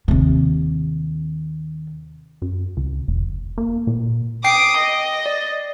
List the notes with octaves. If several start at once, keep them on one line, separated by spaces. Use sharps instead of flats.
D#2 C3
F#2
C#2
F1
A#3
A#2
G5 D6 D#6 C7
D#5
D5